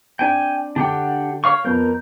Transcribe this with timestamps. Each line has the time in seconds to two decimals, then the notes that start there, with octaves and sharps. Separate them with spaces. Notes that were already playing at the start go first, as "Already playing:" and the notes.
0.19 C4 D4 G5 G#5
0.76 D3 D4 G4 F#5 G5
1.44 C#5 F5 C#6
1.64 F2 B3 A#4 G6